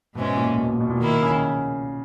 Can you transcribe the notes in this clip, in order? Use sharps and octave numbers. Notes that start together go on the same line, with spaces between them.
G#2 B2 E3 G#3 C#4
A#2
B2
A#2
B2
A#2
D#3 A#3 E4
C#3